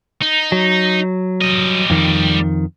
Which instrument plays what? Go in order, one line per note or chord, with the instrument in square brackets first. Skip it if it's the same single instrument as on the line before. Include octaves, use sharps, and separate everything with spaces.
[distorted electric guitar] D#4
[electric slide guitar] F#3
[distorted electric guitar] G3 D#5
[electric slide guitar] F2 D#3